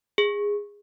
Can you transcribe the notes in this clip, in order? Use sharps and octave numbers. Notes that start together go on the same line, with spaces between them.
G#4